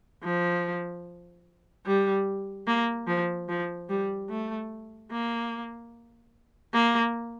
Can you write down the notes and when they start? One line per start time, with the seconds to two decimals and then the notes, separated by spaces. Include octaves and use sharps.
0.23 F3
1.86 G3
2.67 A#3
3.08 F3
3.49 F3
3.89 G3
4.30 A3
5.11 A#3
6.74 A#3